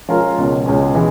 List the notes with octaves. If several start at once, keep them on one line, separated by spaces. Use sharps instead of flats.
F3 G#3 C#4 F4 A#4
C#2 B2 G#3 C#4
C#2 B2 G#3 C#4
E3 G#3